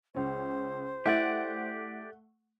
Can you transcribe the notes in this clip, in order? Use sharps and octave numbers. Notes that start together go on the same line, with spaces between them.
C#2 C#4 C5
A3 E4 G4 D5 F#5